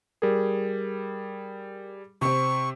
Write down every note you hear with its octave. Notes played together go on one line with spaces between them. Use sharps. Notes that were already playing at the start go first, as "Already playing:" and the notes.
G3 G#4 A#4
C3 C4 C#6